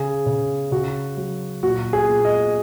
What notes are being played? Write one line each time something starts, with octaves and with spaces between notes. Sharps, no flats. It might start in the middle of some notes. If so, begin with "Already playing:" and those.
Already playing: C#3 G#4
C#3
C#3 F#4
F#3
A#2 F#4
G#4
A#2
D#5